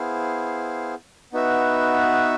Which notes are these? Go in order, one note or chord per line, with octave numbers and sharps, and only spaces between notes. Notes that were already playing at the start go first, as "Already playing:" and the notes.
Already playing: B3 E4 G#4 C5 F5
B3 D#4 F#4 B4 E5